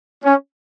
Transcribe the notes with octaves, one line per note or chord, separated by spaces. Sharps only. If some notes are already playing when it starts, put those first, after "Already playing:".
C#4